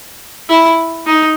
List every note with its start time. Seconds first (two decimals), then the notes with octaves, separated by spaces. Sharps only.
0.50 E4
1.07 D#4